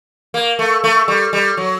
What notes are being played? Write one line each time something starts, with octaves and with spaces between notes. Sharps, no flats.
A#3
A3
A3
G3
G3
F#3